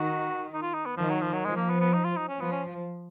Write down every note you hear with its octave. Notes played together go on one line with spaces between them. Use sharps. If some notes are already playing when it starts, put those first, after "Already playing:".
Already playing: D#3 F#4
D#4
F4
D#4
B3
D#3 F3
F#3
F3
F#3
F3 G#3
A#3
B3
B3
D#4
F4
D#4
C#4
F3 B3
C#4